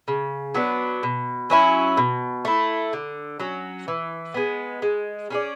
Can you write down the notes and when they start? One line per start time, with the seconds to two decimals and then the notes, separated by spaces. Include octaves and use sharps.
0.08 C#3
0.54 F#3 B3 D4
1.03 B2
1.50 F#3 C#4 E4
1.97 B2
2.45 A3 E4
2.93 D3
3.40 F#3 C#4
3.88 E3
4.34 G#3 B3
4.82 G#3
5.30 C#4 G#4 D5